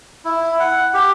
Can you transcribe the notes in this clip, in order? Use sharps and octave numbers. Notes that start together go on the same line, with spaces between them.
E4
F#5
G4